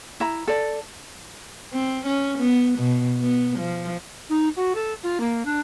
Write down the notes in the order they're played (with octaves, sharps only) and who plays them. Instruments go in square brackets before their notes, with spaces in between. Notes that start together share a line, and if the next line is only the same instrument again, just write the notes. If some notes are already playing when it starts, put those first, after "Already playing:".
[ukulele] E4 A#5
A4 D5
[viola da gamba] C4
C#4
B3
B2
B3
F3
[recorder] D#4
F#4
A4
F4
A#3
D4